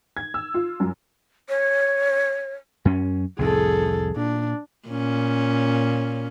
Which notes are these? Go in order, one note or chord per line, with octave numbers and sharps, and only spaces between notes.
G#6
E6
F4
F#2
C#5
F#2 C#4
C2 F2 A2 G#4 A4
A#2 D4
A#2 C#4